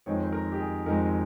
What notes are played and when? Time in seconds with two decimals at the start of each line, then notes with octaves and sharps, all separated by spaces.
0.06 F2 D#3 G#3 C4 C#5
0.23 C5
0.32 A#4
0.52 G4
0.59 G#4
0.86 F2 D#3 G#3 C4 A#4